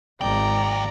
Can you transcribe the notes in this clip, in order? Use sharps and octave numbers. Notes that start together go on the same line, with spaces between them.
G#1 D#2 D5 G5 A#5